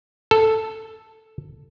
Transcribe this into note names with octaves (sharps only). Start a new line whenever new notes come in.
A4